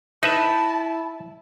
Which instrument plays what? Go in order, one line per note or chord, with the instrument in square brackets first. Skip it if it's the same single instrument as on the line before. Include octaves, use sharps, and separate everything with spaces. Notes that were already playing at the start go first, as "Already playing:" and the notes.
[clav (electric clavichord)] D#4 B4 E5 [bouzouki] E4 [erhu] A5